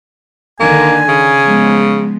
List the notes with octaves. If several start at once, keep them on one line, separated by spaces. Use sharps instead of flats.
D3 D#3 A#3 G#5
C#3
F3 G#3 B3